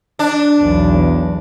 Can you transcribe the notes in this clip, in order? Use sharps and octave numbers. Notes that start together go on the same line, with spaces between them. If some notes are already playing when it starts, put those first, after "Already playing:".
D4
B1 E2